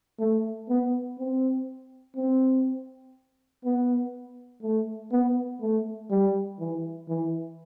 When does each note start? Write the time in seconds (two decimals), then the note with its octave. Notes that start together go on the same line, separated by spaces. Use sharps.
0.19 A3
0.69 B3
1.19 C4
2.16 C4
3.64 B3
4.63 A3
5.11 B3
5.61 A3
6.11 G3
6.59 E3
7.08 E3